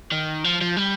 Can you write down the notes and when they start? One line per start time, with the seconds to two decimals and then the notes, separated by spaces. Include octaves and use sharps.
0.12 D#3
0.44 F3
0.62 F3
0.77 G3